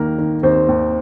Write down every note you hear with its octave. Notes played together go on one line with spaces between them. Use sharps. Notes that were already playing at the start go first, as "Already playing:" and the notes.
Already playing: D#2 D#3 A#3 A#4
D#3
D#2 C4 C5
D#2